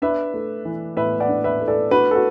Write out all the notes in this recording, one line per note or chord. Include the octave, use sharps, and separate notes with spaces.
D4 B4 E5
A3
E3
A2 B4 E5
D5 F#5
D4
B4 E5
A3
A4 D5
D4 F#4 B4
A4
F#4